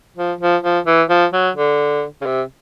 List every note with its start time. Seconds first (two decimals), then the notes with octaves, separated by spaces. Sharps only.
0.17 F3
0.41 F3
0.63 F3
0.87 E3
1.09 F3
1.33 F#3
1.56 D3
2.22 C#3
2.26 C3